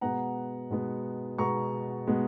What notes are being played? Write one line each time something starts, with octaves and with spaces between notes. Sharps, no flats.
B2 G#3 B3 F#5 A#5
B2 G#3 B3
B2 G#3 B3 A#5 C#6
B2 G#3 B3